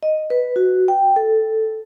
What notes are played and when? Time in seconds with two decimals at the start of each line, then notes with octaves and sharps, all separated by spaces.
0.03 D#5
0.30 B4
0.56 F#4
0.88 G5
1.16 A4